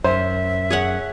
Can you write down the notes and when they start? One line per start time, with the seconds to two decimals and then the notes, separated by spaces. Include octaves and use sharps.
0.04 F#2 C5 E5
0.70 G#4 C#5 F#5